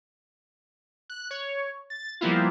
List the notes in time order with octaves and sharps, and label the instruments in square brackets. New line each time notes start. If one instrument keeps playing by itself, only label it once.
[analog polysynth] F#6
C#5
A6
F3 G3 A#3 B3 E4 F4